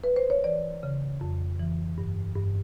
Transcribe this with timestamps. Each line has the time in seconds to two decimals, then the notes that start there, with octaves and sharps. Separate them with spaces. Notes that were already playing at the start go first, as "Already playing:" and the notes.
0.04 B4
0.16 C5
0.30 C#5
0.44 E3 D5
0.83 C#3
1.21 F2
1.60 E3
1.98 G2
2.36 G2